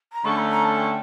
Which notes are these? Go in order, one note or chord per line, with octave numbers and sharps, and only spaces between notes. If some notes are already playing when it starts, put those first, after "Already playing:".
A#5
D3 A3 C#4 C#6
A#5
A#5
A5
G5